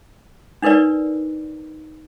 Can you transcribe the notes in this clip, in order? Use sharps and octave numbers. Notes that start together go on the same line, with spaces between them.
D4 D#4 A#4 B4 D5